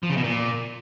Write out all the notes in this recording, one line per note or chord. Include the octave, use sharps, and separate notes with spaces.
F3
C#3
B2
A#2